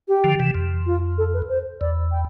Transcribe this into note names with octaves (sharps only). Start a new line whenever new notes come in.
G4
D3 F3
C3 E3
F2
F4
A4
B4
C5
E2 D5
G5